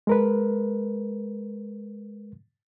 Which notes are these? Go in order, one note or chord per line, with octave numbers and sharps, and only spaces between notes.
G#3 A#4 B4